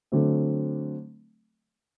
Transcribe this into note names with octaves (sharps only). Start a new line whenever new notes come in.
D3 F#3 A3 C4